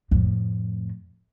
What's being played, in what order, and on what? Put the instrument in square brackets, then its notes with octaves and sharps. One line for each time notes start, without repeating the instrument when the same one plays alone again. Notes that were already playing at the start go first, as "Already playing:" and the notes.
[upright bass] F2 A2